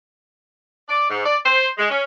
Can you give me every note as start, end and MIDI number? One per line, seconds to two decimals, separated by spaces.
0.88 1.08 74
1.09 1.21 44
1.25 1.37 74
1.44 1.68 72
1.78 1.87 56
1.90 2.03 61